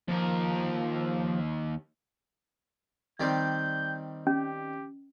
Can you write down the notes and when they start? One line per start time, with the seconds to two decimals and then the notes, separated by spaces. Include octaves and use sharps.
0.08 D#2 F3 A#4
3.20 D#3 G3 C4 G6
4.27 C#4 G4